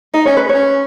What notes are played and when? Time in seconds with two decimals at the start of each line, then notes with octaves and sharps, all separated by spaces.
0.14 D#4 D#5
0.25 C#4 C#5
0.37 B4
0.49 C#4 C#5